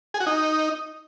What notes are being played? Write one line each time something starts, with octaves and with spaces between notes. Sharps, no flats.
G#4
F#4
D#4